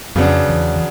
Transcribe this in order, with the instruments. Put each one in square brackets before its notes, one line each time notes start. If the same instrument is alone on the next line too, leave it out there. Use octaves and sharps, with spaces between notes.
[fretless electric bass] F2 F3 [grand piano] C#3 F#3 B3 D4
[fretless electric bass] E2 E3
E3